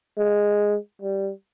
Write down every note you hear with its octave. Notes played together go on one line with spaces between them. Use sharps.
G#3
G3